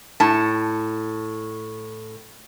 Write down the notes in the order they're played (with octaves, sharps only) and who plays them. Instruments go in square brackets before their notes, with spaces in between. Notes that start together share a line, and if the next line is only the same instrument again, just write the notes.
[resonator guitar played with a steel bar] A2 A5